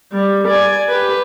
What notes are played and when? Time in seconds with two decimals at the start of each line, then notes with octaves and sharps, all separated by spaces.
0.13 G3
0.48 D5 G#5
0.89 G4 B4